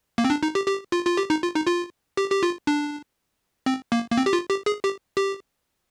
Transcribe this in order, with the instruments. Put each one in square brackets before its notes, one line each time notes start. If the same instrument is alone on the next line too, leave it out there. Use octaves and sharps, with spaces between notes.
[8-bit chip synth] A#3
C4
D4
D#4
G4
G4
F4
F4
G4
D#4
F4
D#4
F4
G4
G4
F4
D4
C4
A#3
A#3
C4
G4
F4
G4
G#4
G4
G4